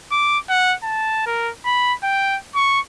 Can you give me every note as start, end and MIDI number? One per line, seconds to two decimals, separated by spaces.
0.12 0.38 86
0.50 0.75 78
0.83 1.24 81
1.26 1.51 70
1.65 1.94 83
2.03 2.38 79
2.55 2.80 85